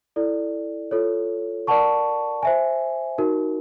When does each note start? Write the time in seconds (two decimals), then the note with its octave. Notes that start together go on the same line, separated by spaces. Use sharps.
0.16 E4 A4 D5
0.91 F4 A4 C#5
1.67 A#4 D5 F#5 A5 C#6
2.43 C5 E5 G#5
3.18 D#4 F#4 A#4